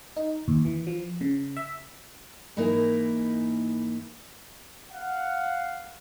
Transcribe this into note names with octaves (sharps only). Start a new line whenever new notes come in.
D#4
D#2
E3
F3
C#3
E5
G#2 E3 A#3 D#4 E4 A#4
F5 F#5